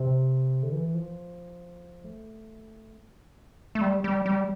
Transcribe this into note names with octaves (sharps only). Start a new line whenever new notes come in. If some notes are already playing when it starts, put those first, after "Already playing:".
Already playing: C3
D3
E3
F3
A3
A3
G3
G3
G3